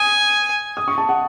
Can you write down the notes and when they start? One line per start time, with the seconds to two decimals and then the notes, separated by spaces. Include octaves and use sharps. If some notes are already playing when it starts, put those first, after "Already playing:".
Already playing: G#5 D#6
0.77 D#6
0.88 C#6
0.98 A5
1.09 F#5